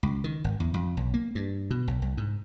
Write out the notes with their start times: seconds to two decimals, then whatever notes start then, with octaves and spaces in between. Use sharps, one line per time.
0.03 C#2
0.24 D#3
0.44 G#1
0.60 E2
0.74 F2
0.97 B1
1.14 A#3
1.35 G2
1.71 B2
1.88 B1
2.02 C2
2.17 G#2